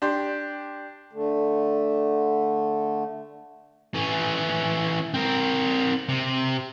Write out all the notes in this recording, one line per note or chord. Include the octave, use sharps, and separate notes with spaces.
D4 G4 C6
D3 A3
E3 C#4
C4 A#4
C3